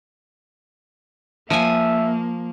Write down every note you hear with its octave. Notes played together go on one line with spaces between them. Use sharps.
F3 A#3 E5 G#5